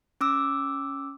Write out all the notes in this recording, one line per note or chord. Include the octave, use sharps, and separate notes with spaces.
C#4 D6 E6